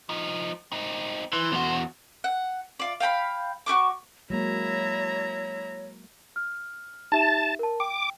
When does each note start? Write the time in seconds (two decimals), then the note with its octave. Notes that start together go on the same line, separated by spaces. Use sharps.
0.09 F3 D#4
0.72 C4 D#4
1.33 E3 C5
1.52 E2 F#4
2.24 F#5
2.79 F4 D5
3.00 F5 G5 A#5 B5
3.66 F#4 G4 C#6 D6
4.30 F#3 G#3 A#3 E4 C#5 A#5
6.36 F6
7.12 D#4 G4 E5 A5
7.59 A#4 A5
7.80 G5 D6